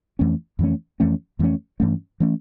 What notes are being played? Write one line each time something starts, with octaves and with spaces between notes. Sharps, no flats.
F2 E3 A3 C#4
F2 E3 A3 C#4
F2 E3 A3 C#4
F2 E3 A3 C#4
G2 E3 A3 C#4
E3 A3 C#4